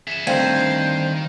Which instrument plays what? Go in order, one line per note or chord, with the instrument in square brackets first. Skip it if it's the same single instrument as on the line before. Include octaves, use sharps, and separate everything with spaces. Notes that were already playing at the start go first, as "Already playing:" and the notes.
[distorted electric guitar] G#4 E5 [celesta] B6 E7
[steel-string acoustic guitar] D2 G2 C4 [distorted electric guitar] D#3 [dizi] C5 [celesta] F5 G5 G#6